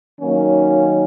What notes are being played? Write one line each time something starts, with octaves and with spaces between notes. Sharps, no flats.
D#3 F#3 A#3 C#4